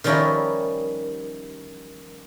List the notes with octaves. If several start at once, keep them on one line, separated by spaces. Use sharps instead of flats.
D#3 F3 G3 C#4 E4 A#4